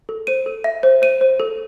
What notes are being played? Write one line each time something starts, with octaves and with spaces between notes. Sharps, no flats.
A4
C5 D#7
A4
E5
C5
C5 D#7
C5
A4